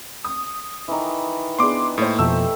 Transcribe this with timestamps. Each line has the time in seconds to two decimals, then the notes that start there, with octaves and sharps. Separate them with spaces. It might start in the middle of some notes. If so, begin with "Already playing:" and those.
0.24 D#6
0.88 D#3 E3
1.59 B3 D4 G#4 C6 D6
1.98 A2 A#3 C5
2.19 F2 B2 F3 A3 G4 E6